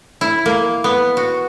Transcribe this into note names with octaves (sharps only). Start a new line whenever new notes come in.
E4
A#3
B3
F#4